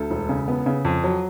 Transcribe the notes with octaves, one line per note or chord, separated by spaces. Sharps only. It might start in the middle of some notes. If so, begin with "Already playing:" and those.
Already playing: D2 A4
E1
C#3
B3
C#3
F2
F#3